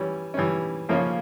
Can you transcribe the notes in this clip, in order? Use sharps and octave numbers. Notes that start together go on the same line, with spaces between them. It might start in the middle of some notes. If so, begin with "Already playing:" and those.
Already playing: E3 G3 C#4
E3 G3 C#4
C#3 F3 A#3 C#4 F4